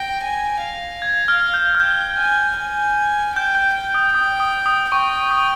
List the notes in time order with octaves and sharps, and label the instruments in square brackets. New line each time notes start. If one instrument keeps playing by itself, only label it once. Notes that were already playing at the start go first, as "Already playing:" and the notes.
Already playing: [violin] G5 [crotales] A#6
[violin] G#5
F5
[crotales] G#6
F6
G6
F6
[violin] G5 [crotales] G6
[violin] G#5
G#5
[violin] G5 [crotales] G6
[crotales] G6
[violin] G5
[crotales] D#6
[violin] G5 [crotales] D#6
[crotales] D#6
D#6
[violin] G5 [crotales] C#6
[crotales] D#6